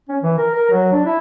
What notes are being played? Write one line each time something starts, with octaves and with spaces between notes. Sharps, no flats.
C#4
E3
A#4
A#4
F#3
D4
E4